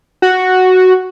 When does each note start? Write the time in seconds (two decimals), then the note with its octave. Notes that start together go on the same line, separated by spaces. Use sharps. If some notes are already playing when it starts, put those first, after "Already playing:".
0.22 F#4